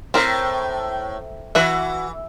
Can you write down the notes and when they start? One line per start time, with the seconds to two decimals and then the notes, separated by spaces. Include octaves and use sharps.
0.14 A2 C4 A#4
1.55 E3 F#4 B4 E5